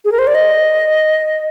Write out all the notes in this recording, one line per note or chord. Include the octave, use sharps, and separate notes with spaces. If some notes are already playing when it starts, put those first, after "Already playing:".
G#4
A#4
C5
D5
D#5